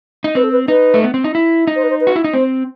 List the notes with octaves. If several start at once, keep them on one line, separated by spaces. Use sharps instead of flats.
D#4
C4 B4
A4
B4
D#4 B4
A3
B3
C4
D#4
E4
D#4
C5
B4
C5
B4
F#4
E4
D#4
C4 C5